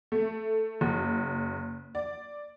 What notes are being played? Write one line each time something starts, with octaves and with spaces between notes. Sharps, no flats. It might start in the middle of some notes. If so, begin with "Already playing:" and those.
A3
F#1
D5